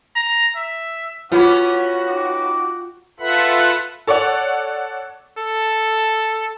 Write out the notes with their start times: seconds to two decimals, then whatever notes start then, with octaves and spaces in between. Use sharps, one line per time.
0.16 A#5
0.56 E5
1.32 B3 C#4 F4 F#4 B4 D6
2.06 D#4 G5 D6
3.20 F4 A4 B4 E5 F#5 B5
4.07 A4 C#5 D5 F#5
5.38 A4